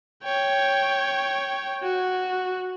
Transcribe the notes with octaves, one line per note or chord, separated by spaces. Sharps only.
C#5 G5
F#4